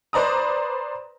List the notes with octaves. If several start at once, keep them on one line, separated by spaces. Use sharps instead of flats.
B4 C5 D5 A#5 D#6